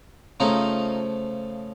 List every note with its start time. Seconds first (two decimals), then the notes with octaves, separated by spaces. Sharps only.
0.40 C#3 F3 A3 D#4 F4